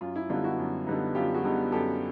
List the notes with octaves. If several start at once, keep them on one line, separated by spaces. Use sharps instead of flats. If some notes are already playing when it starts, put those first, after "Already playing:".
F#2 F4
E4
D3 G3 B3 D#4 F4
E4 F#4
F#2
D3 G3 B3 D#4
F#2 F4 G4
F#4 G#4
D3 G3 B3 D#4
F#2 G4 A4